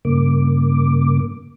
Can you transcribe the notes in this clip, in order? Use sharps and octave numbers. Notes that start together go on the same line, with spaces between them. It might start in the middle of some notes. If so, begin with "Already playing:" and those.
G2 C#3 A#3 D6